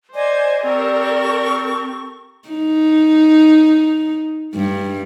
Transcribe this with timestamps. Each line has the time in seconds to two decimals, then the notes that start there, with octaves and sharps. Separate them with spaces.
0.14 C5 D5 D#5 G#5 D6
0.64 C4 G4 A4 A#4 C#6
2.48 D#4
4.54 G2